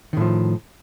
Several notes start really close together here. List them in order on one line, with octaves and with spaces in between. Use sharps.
D#3 A2 F3